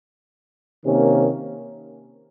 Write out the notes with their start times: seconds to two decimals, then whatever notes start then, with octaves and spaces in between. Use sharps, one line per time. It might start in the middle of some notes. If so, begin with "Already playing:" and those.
0.85 C3 D#3 A#3 C#4